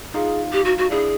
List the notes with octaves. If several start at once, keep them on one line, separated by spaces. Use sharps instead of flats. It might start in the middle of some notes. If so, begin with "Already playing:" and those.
D#4 F4 G#4
G4
F#4
F#4
D4 E4 G#4